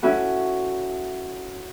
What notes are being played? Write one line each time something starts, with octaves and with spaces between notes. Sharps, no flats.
C#4 E4 F#4 A4